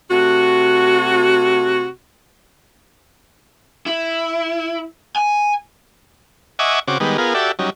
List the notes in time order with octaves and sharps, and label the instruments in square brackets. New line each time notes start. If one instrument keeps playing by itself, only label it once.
[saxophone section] C3 A3 F#4
[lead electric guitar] E4
G#5
[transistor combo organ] D#5 E5 F#5 G#5 C#6 D6
C#3 C4 F#4 D6
D#3 G3 G#3 B3
B3 F4 G#4 A#4
F#4 G4 A4 D5 E5
F#3 G3 C#4 D#4